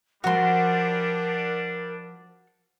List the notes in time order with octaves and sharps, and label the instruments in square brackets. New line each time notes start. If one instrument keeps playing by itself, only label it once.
[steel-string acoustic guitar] F3 F#5 [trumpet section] G3 D4 [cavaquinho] F#4 C6 [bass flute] A#4